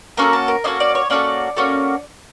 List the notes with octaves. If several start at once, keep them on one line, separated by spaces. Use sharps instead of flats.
A#3 C#4 F#4 A4 A#4
A4
A#4
A#3 C#4 F#4 A4 D#5
D5
C#5
A#3 C#4 F#4 A4 D5
A#3 C#4 F#4 A4